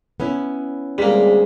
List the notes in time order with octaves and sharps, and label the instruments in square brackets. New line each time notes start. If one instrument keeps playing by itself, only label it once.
[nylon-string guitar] B3 C#4 E4
[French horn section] D2 C4 G#4 [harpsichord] G3 A#3 [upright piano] G#3 B6